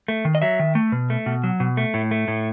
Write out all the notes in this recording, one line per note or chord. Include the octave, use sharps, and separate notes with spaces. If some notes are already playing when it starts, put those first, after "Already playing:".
A3
D#3
D#5
F#3 E5
D#3
A3
B2
A3
B2
F#3
B2
A3
A2
A3
A2